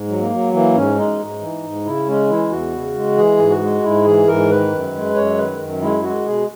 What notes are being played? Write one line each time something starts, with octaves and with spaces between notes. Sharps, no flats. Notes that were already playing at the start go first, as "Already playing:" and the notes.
Already playing: G#2
F#3
A#3
F#3
E3 A#3
G#2 C#4
G#3 D#4
G#2
E3
G#2
C#3 E4
G#3 C#4
E3 E4
E2 F#4
C#3
G#3
E3 G#4
G#2
F#4
G#3
G#2 E4
E3 G#4
G#2 A#4
D#3 B4
F#2
G#3
F#2 C#5
D#3 B4
F#2
G#3 E4
G#3 F#4
B2 G#4